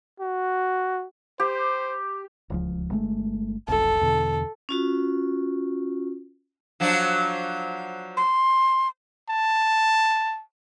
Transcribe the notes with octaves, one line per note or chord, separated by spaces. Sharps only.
F#4
G4 C5
D1 C#2 F3
G1 G#3 A3
F1 B1 B2 A4
E2 B2 D3
C#4 F4 F#4
F3 F#3 D4
C6
A5